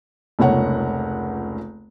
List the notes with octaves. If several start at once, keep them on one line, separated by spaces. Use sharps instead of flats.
F1 C#2 A#3 C#5 F#5